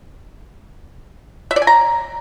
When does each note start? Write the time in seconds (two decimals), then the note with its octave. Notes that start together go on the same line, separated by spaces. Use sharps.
1.51 E5
1.56 D5
1.62 G#5
1.67 A#5